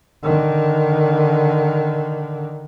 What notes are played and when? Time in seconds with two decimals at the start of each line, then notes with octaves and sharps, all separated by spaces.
0.23 D3 D#3